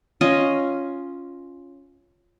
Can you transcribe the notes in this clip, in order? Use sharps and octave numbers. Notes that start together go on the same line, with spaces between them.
C#4 F4 D#5